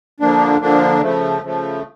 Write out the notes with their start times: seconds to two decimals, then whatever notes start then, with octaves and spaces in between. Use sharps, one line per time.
0.20 D3 F3 A#3 D4
0.61 D3 F3 A#3 D4
1.02 C#3 F3 A3
1.42 C#3 F3 A3